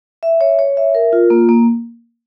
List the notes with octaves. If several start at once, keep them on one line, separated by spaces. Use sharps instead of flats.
E5
C#5
C#5
E5
A#4
F4
A#3
A#3